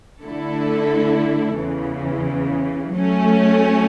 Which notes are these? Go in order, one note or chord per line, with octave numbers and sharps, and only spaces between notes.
D3 A3 E4 A4
E2 C#3 E3
F#3 A3 C#4